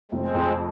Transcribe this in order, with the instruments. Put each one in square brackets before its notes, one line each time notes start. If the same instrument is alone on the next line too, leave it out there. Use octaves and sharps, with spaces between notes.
[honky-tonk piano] F1 [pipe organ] G#3 C4
[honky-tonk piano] F2